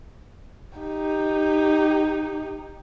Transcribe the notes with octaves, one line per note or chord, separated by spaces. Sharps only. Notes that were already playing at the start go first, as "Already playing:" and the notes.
D#4 G4